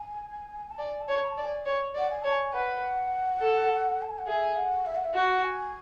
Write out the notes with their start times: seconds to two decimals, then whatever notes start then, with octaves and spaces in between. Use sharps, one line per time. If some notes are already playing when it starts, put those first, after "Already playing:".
Already playing: G#5
0.70 A5
0.79 D5 G#5
1.01 A5
1.08 C#5
1.23 B5
1.27 A5
1.38 D5
1.44 G#5
1.66 C#5
1.95 D5 F#5
2.10 G#5
2.22 C#5 A5
2.32 G#5
2.53 B4 F#5
3.41 A4
4.02 A5
4.10 G#5
4.18 F#5
4.27 G#4 E5
4.56 F#5
4.86 E5
4.95 F#5
5.04 E5
5.14 F#4 F#5
5.44 G#5